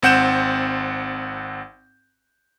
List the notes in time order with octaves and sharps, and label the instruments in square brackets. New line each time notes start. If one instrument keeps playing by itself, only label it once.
[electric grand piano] G#1 C4 F#5 G6 E7